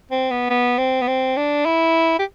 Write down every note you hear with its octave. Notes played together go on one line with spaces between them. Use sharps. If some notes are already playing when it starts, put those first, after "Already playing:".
C4
B3
B3
C4
B3
C4
D4
E4
G4